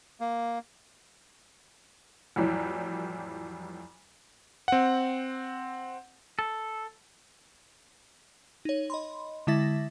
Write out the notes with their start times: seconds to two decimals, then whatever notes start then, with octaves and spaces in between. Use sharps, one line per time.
0.20 A#3
2.36 F2 A2 E3 F#3 G3
4.68 C4 F#5
6.39 A4
8.65 D#4 C#5
8.90 D#5 B5 C6
9.47 D3 G#3 E4 E5 A6 A#6